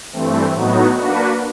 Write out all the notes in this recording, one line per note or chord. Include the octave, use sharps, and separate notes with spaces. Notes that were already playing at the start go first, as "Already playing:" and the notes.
G2 E3 A3 C4
A2 F#3 B3 D#4 F#4
A#3 D4 F#4 B4